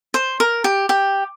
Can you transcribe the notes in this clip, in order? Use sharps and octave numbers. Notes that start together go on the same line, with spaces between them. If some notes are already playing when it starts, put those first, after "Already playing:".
C5
A#4
G4
G4